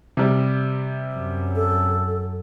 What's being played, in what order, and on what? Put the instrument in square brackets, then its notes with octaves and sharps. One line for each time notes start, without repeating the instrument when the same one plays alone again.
[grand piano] C3 G3
[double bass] F#2
[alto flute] A4